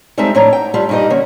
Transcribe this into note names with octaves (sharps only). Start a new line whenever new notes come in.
G3 G#3 C4 D#4 A4 E5
A2 E3 D4 D#4 C#5 A#5
G5
G3 A3 F4
G2 A#2 D#4 G4 D#5
D3 D#3 A#3 C#4